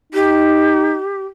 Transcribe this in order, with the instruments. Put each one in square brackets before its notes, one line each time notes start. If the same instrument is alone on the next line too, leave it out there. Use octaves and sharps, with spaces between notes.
[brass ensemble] D#4 [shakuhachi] G4